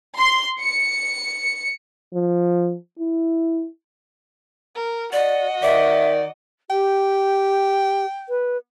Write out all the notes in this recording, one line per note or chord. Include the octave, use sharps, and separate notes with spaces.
C6
C#7
F3
E4
A#4
F#4 D5 D#5
D#3 D5 E5
G4 G5
B4